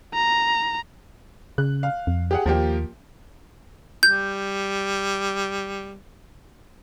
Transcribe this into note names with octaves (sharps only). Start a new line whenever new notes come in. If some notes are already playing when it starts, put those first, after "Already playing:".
A#5
C#3 F#6
F5
F2
G4 G#4 F#5
D#2 F3 A#3 G4
G3 G6